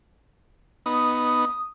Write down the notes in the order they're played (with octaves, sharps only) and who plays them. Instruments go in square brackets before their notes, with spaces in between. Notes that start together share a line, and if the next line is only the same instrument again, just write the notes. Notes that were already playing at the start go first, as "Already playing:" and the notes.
[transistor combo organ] B3 D#4 [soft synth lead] D#6